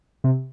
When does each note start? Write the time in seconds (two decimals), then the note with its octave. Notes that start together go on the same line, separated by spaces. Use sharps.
0.24 C3